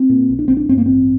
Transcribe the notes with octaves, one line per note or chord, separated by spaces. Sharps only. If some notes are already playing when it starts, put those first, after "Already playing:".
Already playing: C4
A#2
A#1
D4
A#1 C4
D4
G2 C4
A#3
A1 C4